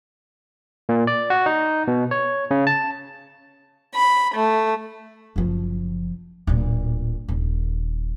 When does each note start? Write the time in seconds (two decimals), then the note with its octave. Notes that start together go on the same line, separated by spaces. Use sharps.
0.89 A#2
1.07 D5
1.30 F#4
1.46 D#4
1.88 B2
2.11 C#5
2.51 C#3
2.67 A5
3.94 B5
4.36 A3
5.36 F#1 F3
6.47 D1 A#2
7.28 D#1